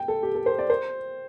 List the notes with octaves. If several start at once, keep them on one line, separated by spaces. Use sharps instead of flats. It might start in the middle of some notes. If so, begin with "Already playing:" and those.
Already playing: G5
A4
G4
A4
C5
D5
C5